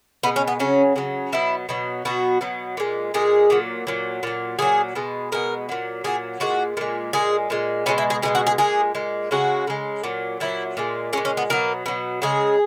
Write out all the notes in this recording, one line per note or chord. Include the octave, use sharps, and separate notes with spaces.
B2 G#3 B3
C#4
B3
C#3 F#3 C#4
C#3 F#3
B2 F#3 E4
B2 F#3
B2 F#3 F#4
B2 F#3
A#2 G#3
A#2 G#3 G#4
A#2 F#3
A#2 F#3
A#2 F#3
A#2 F#3 G#4
B2 G#3
B2 G#3 A#4
A#2 F#3
A#2 F#3 G#4
A#2 G#3 F#4
A#2 G#3
A#2 G#3 G#4
A#2 G#3
B2 G#3 C#4
E4
G#4
B2 G#3 G#4
F#4
G#4
A#2 G#3 G#4
A#2 G#3
C#3 G#3 F#4
C#3 G#3
A#2 F#3
A#2 F#3 E4
A#2 G#3
A#2 G#3 C#4
C#4
B3
B2 F#3 A#3
B2 F#3
C#3 G#3 G#4